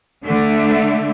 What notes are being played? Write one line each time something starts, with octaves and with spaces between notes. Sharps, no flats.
D3 A3